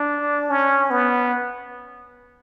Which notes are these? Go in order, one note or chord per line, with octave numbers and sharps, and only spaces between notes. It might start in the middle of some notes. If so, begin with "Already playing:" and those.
Already playing: D4
C#4
B3